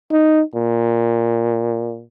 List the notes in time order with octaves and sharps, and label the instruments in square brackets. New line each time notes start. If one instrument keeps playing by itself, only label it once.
[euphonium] D#4
A#2